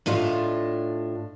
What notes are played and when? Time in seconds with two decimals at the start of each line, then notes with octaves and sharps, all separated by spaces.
0.06 A2 A3 D4 F4 D#5